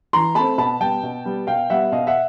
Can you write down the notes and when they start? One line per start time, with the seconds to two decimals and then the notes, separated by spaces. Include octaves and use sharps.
0.13 E3 A#5 C6
0.35 A3 C4 A5 B5
0.58 B2 A5 B5
0.80 G3 B3 G5 A5
1.03 B2
1.25 G3 B3
1.47 B2 F5 G5
1.70 G3 B3 E5 F#5
1.92 B2 D#5 F5
2.07 E5 F#5